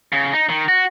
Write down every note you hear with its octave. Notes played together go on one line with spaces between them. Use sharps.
C#3
D#4
D#3
F#4